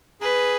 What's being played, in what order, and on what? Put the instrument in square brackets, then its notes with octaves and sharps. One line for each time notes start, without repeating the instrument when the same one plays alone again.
[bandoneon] G#4 [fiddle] B4